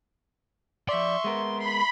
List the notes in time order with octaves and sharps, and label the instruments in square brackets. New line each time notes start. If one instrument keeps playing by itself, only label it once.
[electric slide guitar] F3 D5 [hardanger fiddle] E5 C#6 [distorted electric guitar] C6
[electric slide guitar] G#3 B3 A#4
[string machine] B5 [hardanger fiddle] C6